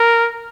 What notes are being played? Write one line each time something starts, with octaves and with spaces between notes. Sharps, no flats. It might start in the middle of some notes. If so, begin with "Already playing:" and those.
Already playing: A#4